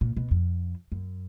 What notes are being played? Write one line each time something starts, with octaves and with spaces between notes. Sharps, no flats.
A#2
B2
F2
F#2